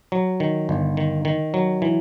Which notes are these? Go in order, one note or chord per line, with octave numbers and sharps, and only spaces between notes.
F#3
D#3
G1
D#3
D#3
F#3
E3